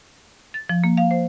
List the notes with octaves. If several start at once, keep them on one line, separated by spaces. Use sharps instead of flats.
A6
F3
A#3
F5
C5